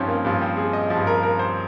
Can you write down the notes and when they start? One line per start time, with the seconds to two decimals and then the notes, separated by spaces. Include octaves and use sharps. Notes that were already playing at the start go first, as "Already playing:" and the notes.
Already playing: G2 F3 C4 C#4 D#4
0.08 A#3
0.25 G2 F3
0.42 C4
0.57 G#4
0.73 D#5
0.90 F3
0.95 G2
1.07 A#4
1.23 A#4
1.39 C5